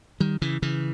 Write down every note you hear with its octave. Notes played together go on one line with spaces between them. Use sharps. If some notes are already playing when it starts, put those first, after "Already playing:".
D#3 G3
C#3 E3
C#3 E3